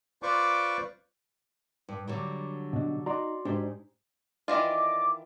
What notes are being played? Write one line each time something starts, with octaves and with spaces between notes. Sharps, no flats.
F4 B4 C5 D5 C#6 D6
G2
D3 F#3 G3
B2 D4
D#4 F#4 D5 A#5 C6
G#2 D4 G4 C5
D#3 E3 F4 D5 D#5 D6